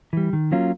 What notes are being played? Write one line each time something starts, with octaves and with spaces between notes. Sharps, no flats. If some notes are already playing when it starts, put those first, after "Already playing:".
E3 G3
D#3
F#3 A#3 C#4 F4